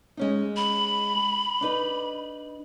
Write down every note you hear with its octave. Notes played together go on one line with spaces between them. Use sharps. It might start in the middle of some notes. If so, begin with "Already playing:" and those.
G#3 C#4 D#4
B5
D4 D#4 B4